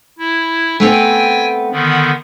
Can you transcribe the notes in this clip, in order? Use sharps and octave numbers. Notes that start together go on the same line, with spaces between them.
E4
A3 B3 C4 G5 G#5
D3 D#3 B3